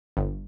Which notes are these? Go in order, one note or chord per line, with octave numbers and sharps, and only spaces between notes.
G1